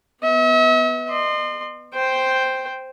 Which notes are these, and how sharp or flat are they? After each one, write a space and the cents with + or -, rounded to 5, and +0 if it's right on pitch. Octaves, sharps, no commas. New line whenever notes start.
B3 +0 E5 -45
D#5 -40 C6 +0
C5 +0 G5 +0